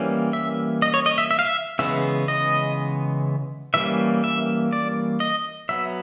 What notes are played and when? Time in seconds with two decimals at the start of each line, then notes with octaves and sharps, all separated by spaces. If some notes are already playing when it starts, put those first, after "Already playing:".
Already playing: E3 G3 A#3 C#4
0.33 E5
0.82 D#5
0.94 C#5
1.06 D#5
1.18 E5
1.31 E5
1.39 F5
1.46 E5
1.79 C#3 E3 G#3 B3 E5
2.28 D#5
3.74 E3 G3 A#3 C#4 E5
4.24 E5
4.73 D5
5.20 D#5
5.69 F#3 B3 E5